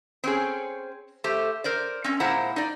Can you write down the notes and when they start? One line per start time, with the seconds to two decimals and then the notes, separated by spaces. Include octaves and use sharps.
0.24 C4 C#4 G#4
1.24 A3 G4 C5
1.64 A#4 C5 D5
2.04 C4 C#4
2.20 A#2 G#3 E4 C5 F#5 A#5
2.56 D#4 D5